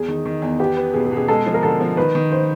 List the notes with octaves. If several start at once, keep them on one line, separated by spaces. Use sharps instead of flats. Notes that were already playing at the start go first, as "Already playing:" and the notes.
Already playing: E2 G#4
D#3
D#3
E2
B3 G4
B3
B2 G#4
G#4
B2
G#4
G#3 A4
F3
A#4
D3 A4
F3
D#3 B4
D#3
C5